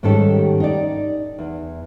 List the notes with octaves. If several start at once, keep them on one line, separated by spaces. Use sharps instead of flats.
G#2 D#3 G3 C#4 G4 A4
D#4 D5
E2